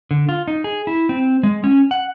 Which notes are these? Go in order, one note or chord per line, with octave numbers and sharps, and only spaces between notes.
D3
F4
D#4
G#4
E4
C4
G#3
C#4
F#5